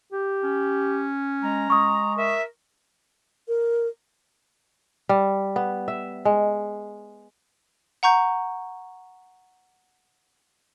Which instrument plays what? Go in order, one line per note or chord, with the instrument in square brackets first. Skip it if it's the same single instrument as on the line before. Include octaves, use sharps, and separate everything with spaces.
[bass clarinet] G4
[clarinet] C#4
[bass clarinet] G#3 [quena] A#5
[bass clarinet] G#3 [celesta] C#6 D#6
[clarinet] A#4 [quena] E5
[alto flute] A#4
[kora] G3
B3
E5
G#3
[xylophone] F#5 A#5 C#6 G6